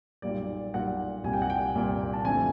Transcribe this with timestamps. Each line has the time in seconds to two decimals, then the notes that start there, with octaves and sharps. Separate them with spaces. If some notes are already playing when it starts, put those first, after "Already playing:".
0.22 B1 A#2 G3 D5
0.74 B1 A#2 G3 F#5
1.24 C2 A#2 G3 G#5
1.33 G5
1.42 F#5
1.50 G5
1.75 C2 A#2 G3
2.13 A5
2.25 F2 D3 F3 A3 G#5